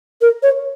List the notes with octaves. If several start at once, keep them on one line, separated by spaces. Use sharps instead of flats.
A#4
C#5